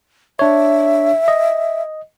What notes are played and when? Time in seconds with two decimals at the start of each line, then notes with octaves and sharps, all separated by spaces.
0.39 D4 C#5 E5
1.28 D#5